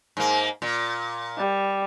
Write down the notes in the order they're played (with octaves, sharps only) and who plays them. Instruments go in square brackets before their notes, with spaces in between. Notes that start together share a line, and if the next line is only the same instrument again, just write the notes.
[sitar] G#2 A#3
A#2
[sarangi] G3